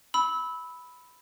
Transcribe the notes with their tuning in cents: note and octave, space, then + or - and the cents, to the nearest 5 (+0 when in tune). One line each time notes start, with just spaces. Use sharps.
B5 +0 E6 -20